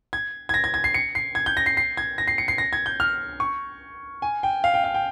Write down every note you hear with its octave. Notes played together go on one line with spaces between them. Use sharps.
G#6
G#6
A#6
G#6
G#6
C7
C#7
C7
G#6
G6
A#6
C7
C7
G#6
A#6
C7
C#7
C7
A#6
G#6
G6
F6
C#6
G#5
G5
F5
G5
F5
G5